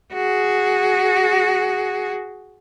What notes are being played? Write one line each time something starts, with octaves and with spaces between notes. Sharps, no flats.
F#4 G#4